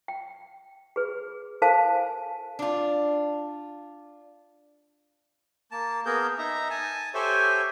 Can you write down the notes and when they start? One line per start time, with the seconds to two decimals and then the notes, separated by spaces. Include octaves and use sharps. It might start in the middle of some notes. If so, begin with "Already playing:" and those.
0.08 G5
0.96 G#4 B4
1.62 E4 A4 A#4 C5 F5 A5
1.96 G#5
2.59 D4 F4
5.71 A#3 A5
6.06 A#3 B3 G#4 A#4 G6
6.38 D#4 E5 A#5
6.70 G#5 A5
7.14 G4 A4 C5 C#5 E5 G#5